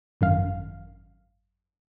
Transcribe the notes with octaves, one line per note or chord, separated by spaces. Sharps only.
G#1 F#2 F5